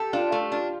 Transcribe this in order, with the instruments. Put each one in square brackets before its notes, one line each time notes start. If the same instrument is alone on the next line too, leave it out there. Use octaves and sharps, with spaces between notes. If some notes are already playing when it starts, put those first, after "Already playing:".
Already playing: [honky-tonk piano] G4 [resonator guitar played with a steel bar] A4
[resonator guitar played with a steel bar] D4 [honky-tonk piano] F4
[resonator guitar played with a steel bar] A3
D4